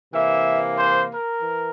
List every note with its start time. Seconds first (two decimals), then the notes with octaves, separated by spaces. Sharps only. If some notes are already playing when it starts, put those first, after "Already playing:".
0.12 C3 E3 A#3 E5
0.78 C5
1.10 A#4
1.42 E3